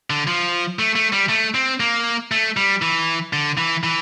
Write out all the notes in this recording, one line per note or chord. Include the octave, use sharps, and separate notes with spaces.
D3
F3
A3
A3
G3
A3
C4
A#3
A3
G3
E3
D3
E3
E3